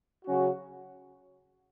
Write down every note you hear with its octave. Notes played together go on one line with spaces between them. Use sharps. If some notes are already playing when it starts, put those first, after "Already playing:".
C#3 F#3 C#4 F#4